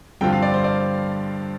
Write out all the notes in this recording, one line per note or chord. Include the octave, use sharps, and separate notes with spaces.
G2 D3 F3 C4 F4 G5
F5
D5
C5
D5